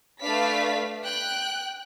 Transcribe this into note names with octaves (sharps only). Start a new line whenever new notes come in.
A3 D4 B4 D5 F5 B6
G5 F#6